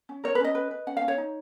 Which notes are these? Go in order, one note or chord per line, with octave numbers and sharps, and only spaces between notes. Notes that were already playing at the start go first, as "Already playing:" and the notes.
C#4
A#4 C#5
B4
C#4 D#5
B4
B4
C#4 F#5
F5
C#4
C#5
D#4